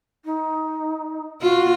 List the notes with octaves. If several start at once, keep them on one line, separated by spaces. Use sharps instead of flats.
D#4
F4 F#4